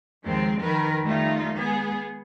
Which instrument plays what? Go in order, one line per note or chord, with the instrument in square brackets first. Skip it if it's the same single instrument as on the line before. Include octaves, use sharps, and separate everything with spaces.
[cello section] D#2 F3 G#3 C4
F2 D#3 A#4 B4
D#3 G3 A3 D#4 F4
G#3 B3 G#4